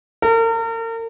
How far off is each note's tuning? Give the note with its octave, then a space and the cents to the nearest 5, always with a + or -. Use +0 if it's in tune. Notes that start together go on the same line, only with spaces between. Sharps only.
A#4 -40